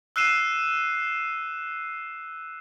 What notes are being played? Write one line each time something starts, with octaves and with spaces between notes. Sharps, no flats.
E6 F#6 C7 D#7 E7